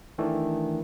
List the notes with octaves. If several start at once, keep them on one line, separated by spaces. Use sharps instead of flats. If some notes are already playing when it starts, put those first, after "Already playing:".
D#3 E3 A3 D4